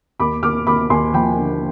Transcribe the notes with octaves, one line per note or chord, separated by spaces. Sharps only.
D#2 B5 D6
D#2 D6 F6
D#2 B5 D6
D#2 G#5 C6
F3 G5 B5
D3